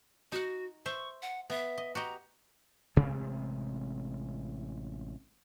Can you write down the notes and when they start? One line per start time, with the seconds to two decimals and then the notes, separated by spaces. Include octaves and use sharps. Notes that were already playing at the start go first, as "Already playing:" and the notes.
0.32 D#4 F#4 F#5
0.86 C5 E5 C#6
1.22 F#5
1.50 B3 E5
1.78 D#5
1.95 F#4 G4 D#5 A#5
2.96 A1 C3 G#3 C4